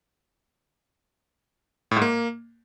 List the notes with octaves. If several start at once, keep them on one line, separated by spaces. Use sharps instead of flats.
A2
G#2
A#3